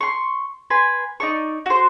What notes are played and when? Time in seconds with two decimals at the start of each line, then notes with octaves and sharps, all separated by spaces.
0.01 C6 C#6
0.70 B4 G#5 C6
1.20 D#4 D5 C#6
1.66 F#4 C5